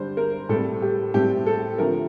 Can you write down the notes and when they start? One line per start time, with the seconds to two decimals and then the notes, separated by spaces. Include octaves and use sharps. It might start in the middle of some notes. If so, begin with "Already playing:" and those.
Already playing: D3 G3 D4 C5
0.17 A#4
0.49 A2 G3 C4 A4
0.82 G4
1.14 A2 G3 C4 G4
1.46 A4
1.78 D3 F3 A3 C4 A#4